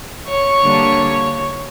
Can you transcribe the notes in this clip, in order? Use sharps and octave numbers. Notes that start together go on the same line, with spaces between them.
C#5 C#6
D3 G3 A#3 D4